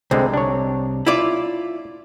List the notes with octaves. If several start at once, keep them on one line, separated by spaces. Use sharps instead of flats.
C2 D3 G#3 C4
D4 C#5
E4 F4 D5